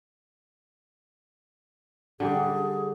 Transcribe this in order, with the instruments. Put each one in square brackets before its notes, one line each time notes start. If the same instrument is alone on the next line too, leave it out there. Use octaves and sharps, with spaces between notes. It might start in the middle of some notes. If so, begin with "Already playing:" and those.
[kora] D3 G3 G4 [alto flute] G#4